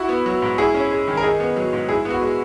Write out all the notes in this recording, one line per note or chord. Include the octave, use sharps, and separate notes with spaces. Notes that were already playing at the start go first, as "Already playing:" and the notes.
Already playing: E4 F#4
B3
F#3
G#2
E4 G#4
C#4
G#3
D#3
A#4
D#4 G#4
B3
F#3
G#2
E4 G#4
B3
F#4
G#3